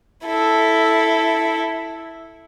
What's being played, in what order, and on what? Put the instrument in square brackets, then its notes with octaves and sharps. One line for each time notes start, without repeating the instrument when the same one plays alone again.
[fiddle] E4 A4